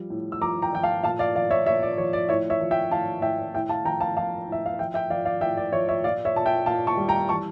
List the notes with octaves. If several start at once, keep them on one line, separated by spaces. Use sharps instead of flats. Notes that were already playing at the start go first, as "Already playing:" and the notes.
Already playing: F3 G3
A2
E6
F3 A#5 D6
G5 A#5
F3 G5
F5 A5
A#2 F5 A5
D5 F5
F3 D5 F5
C#5 E5
A#2 C#5 E5
D5
F3 C#5
D5
A2 C#5 E5
C#5 E5
F3
E5 G5
A2 F5 A5
A2 E5 G5
A2 E5 G5
F5 A5
F3 G5 A#5
F5 A5
F3 F5 A5
A2 E5
F5
F3 E5 G5
E5 G5
F3 D5 F5
D5 F5
A2 E5 G5
D5
F3 C#5 E5
C#5 E5
A#2 D5 F5
C#5 E5
A#2 A5
E5 G5
A#2 F5 A5
A5 C#6
G3
G5 A#5
E3 A5 C#6